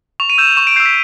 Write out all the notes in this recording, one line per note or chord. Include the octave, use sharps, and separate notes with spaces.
C#6 F7
D#7
E6 G6 E7
F7
C#6 E7
D7
E6 G6 C7
B6